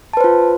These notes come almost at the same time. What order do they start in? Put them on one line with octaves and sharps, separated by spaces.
A5 B4 C5 F4